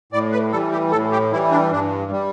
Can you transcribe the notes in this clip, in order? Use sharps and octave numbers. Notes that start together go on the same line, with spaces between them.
A2 D5
B4
E3 G3 A4
G4
A2 A4
G4
E3 G3 E4
D4
G2 D4
G3